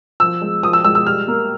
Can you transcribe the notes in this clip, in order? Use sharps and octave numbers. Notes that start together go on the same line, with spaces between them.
F3 E6
G#3
F3 D#6
E6
G#3 E6
E6
G3 F6
A#3